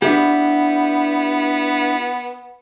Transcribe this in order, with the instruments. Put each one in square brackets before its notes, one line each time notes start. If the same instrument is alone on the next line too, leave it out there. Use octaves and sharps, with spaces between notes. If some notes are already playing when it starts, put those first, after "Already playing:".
[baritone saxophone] B3 [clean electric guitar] D4 E4 G4